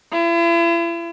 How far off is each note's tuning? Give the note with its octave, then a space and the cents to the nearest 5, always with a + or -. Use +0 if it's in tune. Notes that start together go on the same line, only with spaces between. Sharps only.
E4 +40